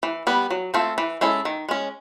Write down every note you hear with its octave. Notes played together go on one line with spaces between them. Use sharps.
E3
G3 B3
F#3
A3 C4 F4 A4
E3
G#3 C#4 E4 A4
D#3
G#3 C#4